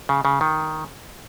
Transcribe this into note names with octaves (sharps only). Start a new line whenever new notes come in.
C#3
C#3
D#3